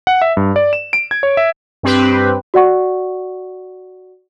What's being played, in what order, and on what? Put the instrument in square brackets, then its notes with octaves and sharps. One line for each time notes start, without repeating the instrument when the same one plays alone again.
[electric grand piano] F#5
E5
G2
D5
E7
D7
G#6
C#5
E5
[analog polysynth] G2 C4 G4 B4
[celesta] F#4 D5 F#5 C#6